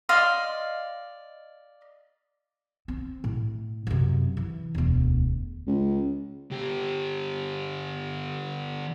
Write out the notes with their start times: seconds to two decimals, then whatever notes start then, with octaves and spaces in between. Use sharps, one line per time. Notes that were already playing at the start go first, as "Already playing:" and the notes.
0.09 D5 D#5 F5 C6
2.88 C4
3.24 A2
3.87 F#2 C3
4.37 E3
4.75 E1 D2
5.67 C#2
6.51 D3 G4